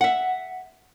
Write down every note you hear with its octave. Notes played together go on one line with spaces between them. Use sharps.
E5 F#5